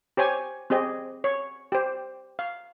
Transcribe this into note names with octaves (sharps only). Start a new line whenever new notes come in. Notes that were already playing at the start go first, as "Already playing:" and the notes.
G4 C5 C#5 G#5
C4 G4 G#4 D#5
C#5
G4 C5
F5